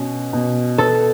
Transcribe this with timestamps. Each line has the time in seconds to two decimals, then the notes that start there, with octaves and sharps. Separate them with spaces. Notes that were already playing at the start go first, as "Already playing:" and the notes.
Already playing: B2 C#4
0.33 B2
0.78 B3 A4